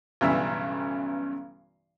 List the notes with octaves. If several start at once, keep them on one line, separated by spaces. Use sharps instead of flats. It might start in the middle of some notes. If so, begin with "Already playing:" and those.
B1 G2 C#3 E3 E5 E6